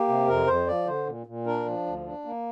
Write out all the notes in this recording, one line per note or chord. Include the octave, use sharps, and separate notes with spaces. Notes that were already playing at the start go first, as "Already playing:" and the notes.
Already playing: A#3 G4
C3
F2 A#4
F2 C5
F3 D5
D3 C5
A#2
A#2
D4 A#4
F3
D2
D4
A#3